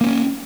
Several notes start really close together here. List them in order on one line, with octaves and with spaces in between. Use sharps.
A#3 C4 C#4